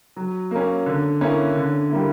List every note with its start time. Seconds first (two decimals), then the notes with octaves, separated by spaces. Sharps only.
0.16 F#3
0.51 A#3 C#4
0.86 D3
1.21 A#3 C#4 E4
1.56 D3
1.90 G3 A#3 E4